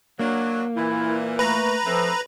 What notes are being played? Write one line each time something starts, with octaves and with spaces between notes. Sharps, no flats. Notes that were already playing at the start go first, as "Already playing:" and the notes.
F#3 A#3 D4
A#2 E3 E4
A3 B4 A#5
F3 A3 C4